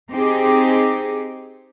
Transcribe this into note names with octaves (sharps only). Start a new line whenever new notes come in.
C4 D#4 G4 G#4